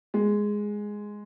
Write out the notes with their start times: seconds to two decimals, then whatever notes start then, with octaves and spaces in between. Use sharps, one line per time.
0.14 G#3